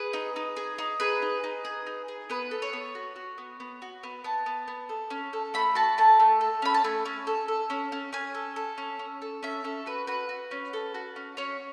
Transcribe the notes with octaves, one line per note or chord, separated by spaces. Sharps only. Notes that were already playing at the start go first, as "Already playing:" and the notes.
Already playing: G#4 B4
D#4
D#4
G#4
D#4
G#4 B4
D#4
D#4
G#4
D#4
G#4
B3 B4
A4
C#5
B3
F#4
F#4
B3
B3
F#4
B3
B3 A5
B3
B3
A4
C#4
A4
A3 B5
F#4 A5
A3 A5
A3
A4
C#4 B5
A5
A3 G#5
C#4
A4
A4
C#4
C#4
C#4 G#5
A4
A4
C#4
C#4
A4
C#4 E5
C#4 A4
F#4 B4
F#4 B4
F#4
C#4
A4
F#4
C#4
C#4 C#5